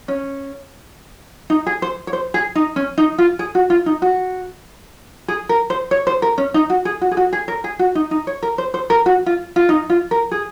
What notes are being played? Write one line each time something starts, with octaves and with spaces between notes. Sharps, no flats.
C#4
D#4
G#4
C5
C#5
C5
G#4
D#4
C#4
D#4
F4
G#4
F#4
F4
D#4
F#4
G#4
A#4
C5
C#5
C5
A#4
C#4
D#4
F#4
G#4
F#4
G#4
F#4
G#4
A#4
G#4
F#4
D#4
D#4
C#5
A#4
C5
C5
A#4
F#4
F4
F4
D#4
F4
A#4
G#4